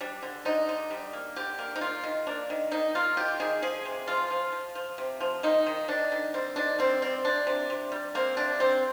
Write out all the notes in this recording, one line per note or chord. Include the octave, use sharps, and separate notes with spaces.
G3 D4
D3
D3 D#4
D3
G3
A#3
D3 G4
A#3
D#4
A#3 F4
D#3
A#3 D4
D#3
D#3 D#4
A#3 F4
D#3 G4
D#3 G#4
F3 G#4
C3
F3 F4
F3
F3
F3
C3
F3
D#3 D#4
D#3
D#3 D4
D#3
G3 C4
D#3 D4
G3 C4
G3 C4
C3 D4
C3
C3
G3
A#3 C4
C3 D4
G3 C4